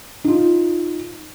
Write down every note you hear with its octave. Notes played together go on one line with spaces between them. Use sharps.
D#4 F4